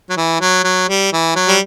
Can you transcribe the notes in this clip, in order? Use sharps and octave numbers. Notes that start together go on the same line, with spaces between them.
F#3
E3
F#3
F#3
G3
E3
F#3
G3